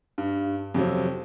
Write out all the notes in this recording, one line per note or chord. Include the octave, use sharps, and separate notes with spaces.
G2
F2 C3 F#3 C4